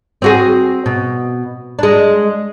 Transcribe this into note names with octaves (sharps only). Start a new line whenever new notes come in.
C4 F#4 G#4
B2
G#3 D4